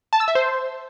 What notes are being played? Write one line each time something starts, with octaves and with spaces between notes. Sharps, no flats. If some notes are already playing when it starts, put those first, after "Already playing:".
A5
E6
E5
C5